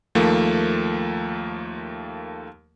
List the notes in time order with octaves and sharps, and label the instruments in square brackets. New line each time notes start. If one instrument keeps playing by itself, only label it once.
[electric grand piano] D#2 F3 A3 A#3